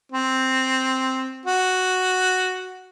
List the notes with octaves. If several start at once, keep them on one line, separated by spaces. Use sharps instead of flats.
C4
F#4